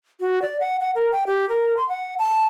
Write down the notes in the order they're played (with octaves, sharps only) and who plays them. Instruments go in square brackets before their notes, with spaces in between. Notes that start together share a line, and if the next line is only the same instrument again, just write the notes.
[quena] F#4
D5
F#5
F#5
A#4
G5
G4
A#4
C6
F#5
A5